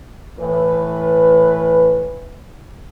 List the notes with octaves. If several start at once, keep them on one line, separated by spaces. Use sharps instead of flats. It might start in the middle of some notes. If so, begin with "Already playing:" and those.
A2 E3 B4